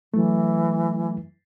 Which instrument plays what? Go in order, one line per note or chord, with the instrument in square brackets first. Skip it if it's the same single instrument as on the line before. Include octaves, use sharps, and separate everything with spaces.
[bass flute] E3 [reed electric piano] F#3 A3